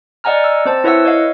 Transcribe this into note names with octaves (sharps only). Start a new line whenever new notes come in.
D5 D#5 F#5 G#5 A#5 F6
E6
C4 C5 A5
E4 B4 C#5 E5 F#5 E6
C#5 D#5 F5